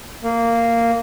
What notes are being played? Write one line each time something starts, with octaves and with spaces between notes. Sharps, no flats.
A#3